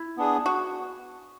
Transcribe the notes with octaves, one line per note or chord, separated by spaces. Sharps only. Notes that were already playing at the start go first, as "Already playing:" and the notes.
Already playing: E4
B3 D4 G#4
F#4